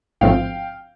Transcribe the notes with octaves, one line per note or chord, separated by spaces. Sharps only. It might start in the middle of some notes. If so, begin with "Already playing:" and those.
A1 G#2 F3 A3 C4 F5 G5